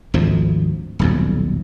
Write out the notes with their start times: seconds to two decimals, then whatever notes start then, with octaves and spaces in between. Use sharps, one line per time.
0.14 G#1 D2 F3
0.99 D#1 B1 F2